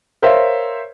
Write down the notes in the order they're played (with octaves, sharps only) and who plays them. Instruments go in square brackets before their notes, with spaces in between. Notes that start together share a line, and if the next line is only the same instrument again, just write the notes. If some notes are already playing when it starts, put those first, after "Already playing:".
[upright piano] A#4 C5 C#5 E5 F5